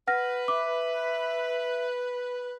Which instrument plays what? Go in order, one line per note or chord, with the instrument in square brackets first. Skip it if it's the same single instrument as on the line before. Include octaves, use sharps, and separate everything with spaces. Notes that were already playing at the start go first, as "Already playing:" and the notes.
[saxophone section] B4 [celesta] F#5 F6 A#6
[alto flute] E5 [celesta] D6